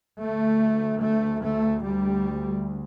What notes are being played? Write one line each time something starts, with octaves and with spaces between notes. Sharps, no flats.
D2 A3
A3
A3
G3